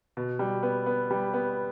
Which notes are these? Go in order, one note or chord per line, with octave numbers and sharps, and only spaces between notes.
B2
G3
B3
B3
G3
B3